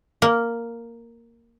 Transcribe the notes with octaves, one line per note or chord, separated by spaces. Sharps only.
A#3